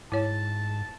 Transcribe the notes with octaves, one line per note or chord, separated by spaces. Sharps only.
G#2 E4 C#5 A5